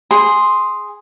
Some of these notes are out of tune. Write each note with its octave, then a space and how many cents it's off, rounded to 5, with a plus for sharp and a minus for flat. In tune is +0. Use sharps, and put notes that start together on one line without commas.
G#4 +0 C6 +0